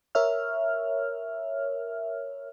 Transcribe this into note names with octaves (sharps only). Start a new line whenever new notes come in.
A#4 C#5 E5 F6